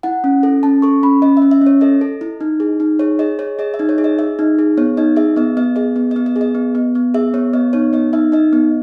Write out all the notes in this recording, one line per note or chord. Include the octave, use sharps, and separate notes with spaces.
E4 F#5
C#4
A4
C#4 A5
A4 C#6
C#4 B5
C#4 D#5
C#4 E5
E5
C#4
C#5
A4 D#5
A4
E4
D#4
G#4
D#4
G#4 C#5
G#4 D#5
G#4 C#5
G#4 D#5
E5
D#4
C#5
G#4
D#5
G#4 E5
D#4
G#4
B3 C#5
D#4 D#5
G#4 E5
B3 D#5
B3 D#5
G#4 D#5
B3
B3 D#5
D#5
G#4
D#5
B3
B3
B3
G#4 E5
B3 C#5
B3 D#5
D#4 C#5
B3 D#5
D#4 E5
D#4 D#5
B3